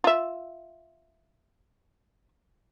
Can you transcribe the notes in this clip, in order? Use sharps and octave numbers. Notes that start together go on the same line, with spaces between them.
F4 E5